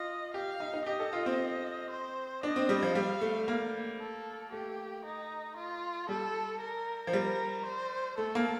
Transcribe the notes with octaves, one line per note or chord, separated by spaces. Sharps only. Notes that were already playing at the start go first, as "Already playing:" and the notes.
Already playing: F4 D#5
G4 F5
D#4
D#4
G4 D#5
A4
F4
C4
C5
D4 D#5
C4
G3
F3
G3 F5
A3
A#3
A4
A3 G4
D#4
F4
G3 A4
A#4
F3
G3 A#4
C5
A3 A4
A#3